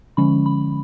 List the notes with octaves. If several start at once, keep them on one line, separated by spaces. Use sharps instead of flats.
D3 F3 G#3 C#4 B5
B5